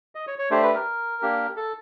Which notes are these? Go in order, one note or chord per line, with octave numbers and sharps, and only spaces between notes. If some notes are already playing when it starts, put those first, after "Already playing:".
D#5
C#5
C#5
A3 D4 G4 C5
B4
A#4
A#3 D4 G4
A4